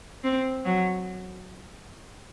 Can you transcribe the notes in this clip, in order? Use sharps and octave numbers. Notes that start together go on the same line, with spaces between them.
C4
F#3